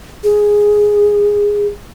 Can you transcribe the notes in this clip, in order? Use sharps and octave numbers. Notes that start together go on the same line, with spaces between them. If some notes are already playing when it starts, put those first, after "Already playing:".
G#4